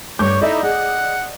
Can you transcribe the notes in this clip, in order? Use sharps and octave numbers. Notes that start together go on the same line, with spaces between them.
G2 A3 C#5 D6 G6
D#4 E4 A4 D5 D#5
G#4 F#5